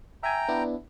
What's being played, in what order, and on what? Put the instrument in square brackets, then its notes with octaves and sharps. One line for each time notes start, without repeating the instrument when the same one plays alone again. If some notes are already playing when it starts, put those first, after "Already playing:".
[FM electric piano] E5 G#5 [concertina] G5 A#5
[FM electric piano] B3 D4 E4